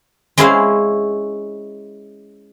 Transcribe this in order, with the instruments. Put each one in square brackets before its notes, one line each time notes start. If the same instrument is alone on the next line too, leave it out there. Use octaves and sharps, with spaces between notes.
[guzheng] G#3 C#4 E4 G#4 C5 F5